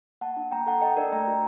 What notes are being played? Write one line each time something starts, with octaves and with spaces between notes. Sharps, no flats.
A#3 F#5 A5
D4
A#3 G5 A#5
A4 F#5 A5
A4 D#5 G5
D4 A#4 D5
A3 G5 A#5
F#4